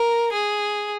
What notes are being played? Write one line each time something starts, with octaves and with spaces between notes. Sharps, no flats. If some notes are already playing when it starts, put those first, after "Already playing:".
Already playing: A#4
G#4